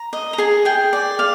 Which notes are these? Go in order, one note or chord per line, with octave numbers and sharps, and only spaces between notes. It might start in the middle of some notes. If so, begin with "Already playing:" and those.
Already playing: A#5
D#5
A#5
G#4 G#5
G#4 G5
D5
D5 F5